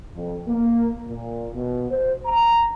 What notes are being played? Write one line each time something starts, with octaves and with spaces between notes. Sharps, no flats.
F2
A#3
A#2
B2
C5
A#5